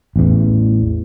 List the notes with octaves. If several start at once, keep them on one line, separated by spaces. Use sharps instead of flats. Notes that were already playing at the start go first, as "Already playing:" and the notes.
A1 E2